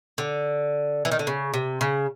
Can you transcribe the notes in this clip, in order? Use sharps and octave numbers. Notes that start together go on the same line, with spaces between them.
D3
E3
D#3
D3
C#3
C3
C#3